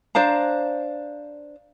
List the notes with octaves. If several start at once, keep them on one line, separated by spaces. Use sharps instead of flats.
D4 C5 F5 A#5